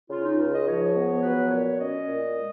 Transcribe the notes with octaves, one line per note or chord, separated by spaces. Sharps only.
C#3 F4
D#4
C#2 F4
D#5
F3 C#5
B3
F#3 B4
A#2 C#5
C#4 D#5
A#2
G#3